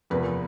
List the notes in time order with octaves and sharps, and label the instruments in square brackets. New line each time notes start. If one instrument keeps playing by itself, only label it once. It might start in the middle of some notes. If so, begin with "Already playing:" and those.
[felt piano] E2 C3 F3 A#3 B4